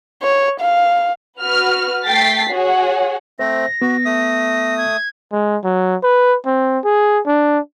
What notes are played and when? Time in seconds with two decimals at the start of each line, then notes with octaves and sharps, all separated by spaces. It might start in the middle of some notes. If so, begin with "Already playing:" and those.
0.23 C#5
0.61 F5
1.40 F#4 B4 F6
2.05 A3 G5 A6 B6 C7
2.50 F#4 G#4 C#5 F#5
3.39 A3 C4 C5 A#6
3.82 B3 F#4
4.05 A3 D#6
4.78 G#6
5.32 G#3
5.64 F#3
6.04 B4
6.46 C4
6.85 G#4
7.26 D4